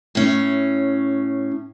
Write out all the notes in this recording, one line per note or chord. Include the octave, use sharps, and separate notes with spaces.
A2 C#4